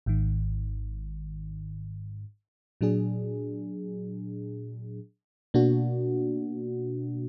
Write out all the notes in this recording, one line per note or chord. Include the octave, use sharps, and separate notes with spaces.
G#1 G#2 D#3
A#2 F#3 D4 G#4
B2 A#3 D4 F#4